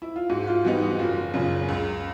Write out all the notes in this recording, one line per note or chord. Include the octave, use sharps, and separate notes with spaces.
E4
F4
G#2 F#4
F4
E3 G3 B3 D#4 F#4
F#4
F#1 F4
F#2 C#3 F4
C#2